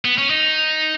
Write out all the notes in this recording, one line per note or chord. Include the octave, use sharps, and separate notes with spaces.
B3
C#4
D#4